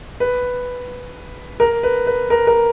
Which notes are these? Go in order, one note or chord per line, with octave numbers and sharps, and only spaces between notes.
B4
A#4
B4
B4
A#4
A#4